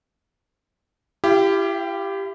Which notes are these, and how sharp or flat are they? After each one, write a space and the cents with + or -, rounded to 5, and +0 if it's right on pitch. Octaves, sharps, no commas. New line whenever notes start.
E4 +35 G4 +0 F5 -25